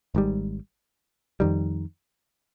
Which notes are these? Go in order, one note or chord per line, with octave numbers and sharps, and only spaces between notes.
G#1 G#2 G3
F2 D#3 G3